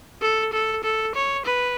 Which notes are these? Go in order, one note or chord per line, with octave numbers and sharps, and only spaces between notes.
A4
A4
A4
C#5
B4